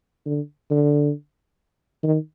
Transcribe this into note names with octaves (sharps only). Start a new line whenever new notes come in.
D3
D3
D#3